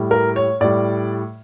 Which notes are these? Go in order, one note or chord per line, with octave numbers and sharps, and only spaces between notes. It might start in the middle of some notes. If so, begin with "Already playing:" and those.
Already playing: A2 G3
A#4
C#5
A2 G3 D5